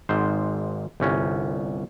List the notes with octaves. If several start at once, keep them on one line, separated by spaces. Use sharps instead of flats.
G#1 G#2 C5
G1 C2 C#4